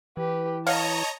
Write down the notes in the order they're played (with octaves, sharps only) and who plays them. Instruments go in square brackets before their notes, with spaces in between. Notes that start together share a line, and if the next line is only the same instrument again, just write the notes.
[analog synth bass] E3 [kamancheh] G4 B4
[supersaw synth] C#5 D#5 A#5 [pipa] F5 F#5 [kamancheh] A5